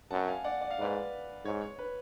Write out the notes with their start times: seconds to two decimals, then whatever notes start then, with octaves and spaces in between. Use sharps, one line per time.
0.11 F#2 F#5 A5
0.28 F5 G#5
0.44 D5 F#5
0.61 D5
0.71 F5
0.78 G#2 B4 D5
1.45 G#2 C#5
1.61 C#5
1.79 B4